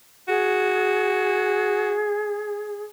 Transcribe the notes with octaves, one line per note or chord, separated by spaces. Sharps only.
F#4 G#4